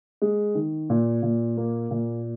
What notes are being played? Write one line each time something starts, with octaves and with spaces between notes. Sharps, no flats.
G#3
D#3
A#2
A#2
A#3
A#2